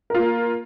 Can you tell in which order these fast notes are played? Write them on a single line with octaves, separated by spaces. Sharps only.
A#4 F4 A#3